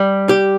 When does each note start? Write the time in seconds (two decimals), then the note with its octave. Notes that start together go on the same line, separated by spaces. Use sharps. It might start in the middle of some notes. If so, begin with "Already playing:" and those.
Already playing: G3
0.29 G4